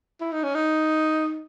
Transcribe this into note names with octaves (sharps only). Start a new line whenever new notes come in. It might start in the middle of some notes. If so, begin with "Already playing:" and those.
E4
D#4
C#4
D#4